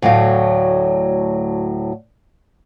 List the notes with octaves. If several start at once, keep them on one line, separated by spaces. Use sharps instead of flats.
D2 A2 F#3 A3 F5